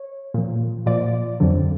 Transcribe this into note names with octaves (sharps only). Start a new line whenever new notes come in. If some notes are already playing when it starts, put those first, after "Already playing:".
Already playing: C#5
A#2 F3
A#2 F3 D5
F2 D3 F#3